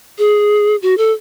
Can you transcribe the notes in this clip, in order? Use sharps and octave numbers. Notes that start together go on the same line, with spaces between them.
G#4
F#4
A4